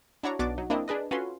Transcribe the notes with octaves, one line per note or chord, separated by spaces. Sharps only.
D4 E4 F#4 C#5 D5 A#5
B1 B3 D4 F#4 D6 A6
F#3 D#4
A#3 C4 D4 E4 A#4 D#5
D4 G#4 B4 D#5
C#4 F4 F#4 A4 B4 C6